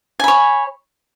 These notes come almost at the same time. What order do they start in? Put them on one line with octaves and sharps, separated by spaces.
G#5 B5 C#5